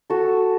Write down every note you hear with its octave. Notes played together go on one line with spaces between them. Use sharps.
F#4 A4